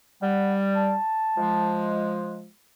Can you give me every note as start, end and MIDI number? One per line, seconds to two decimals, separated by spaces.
0.22 0.96 55
0.22 0.55 78
0.76 1.97 81
1.38 2.49 53
1.38 2.49 56